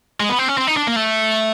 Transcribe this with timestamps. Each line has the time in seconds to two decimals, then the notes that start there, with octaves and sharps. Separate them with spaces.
0.20 G#3
0.29 B3
0.39 C4
0.48 C#4
0.58 C4
0.67 D#4
0.77 D4
0.87 A#3
0.96 A3